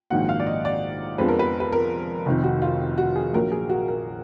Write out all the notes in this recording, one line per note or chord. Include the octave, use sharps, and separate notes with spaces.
A#1 G#2 D#3 F#3 A#3 F#5
F5
D5
D#5
D5
F2 F3 G#3 B3 D4 B4
A#4
B4
B4
A#4
F1 F2 D#3
F#4
F4
F#4
G#4
A#1 A#2 F#3 A#4
G#4
F#4
A#4